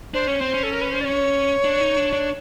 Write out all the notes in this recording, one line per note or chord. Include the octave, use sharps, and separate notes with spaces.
D4 C5
C#4 C#5
C4 C5
C#4
A4
A#4
B4
C5
D5
C#5
D4
D#4
D4
D4